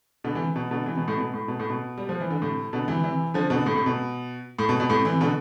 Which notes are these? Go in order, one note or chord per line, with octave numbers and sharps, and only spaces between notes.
B2 D3
C3 E3
B2
B2 D3
C3 E3
B2
A2 C3
B2
A2
B2
A2
B2
G3
F3
E3
D3
A2 C3
B2 D3
C3 E3
C3 E3
D3 F3
B2 D3
A2 C3
A2 C3
B2
A2
B2
B2
A2 C3
C3 E3
B2 D3